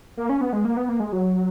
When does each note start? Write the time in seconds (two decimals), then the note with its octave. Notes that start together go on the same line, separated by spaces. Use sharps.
0.17 A#3
0.29 C#4
0.41 B3
0.53 G#3
0.65 A#3
0.77 B3
0.89 A#3
1.00 G#3
1.13 F#3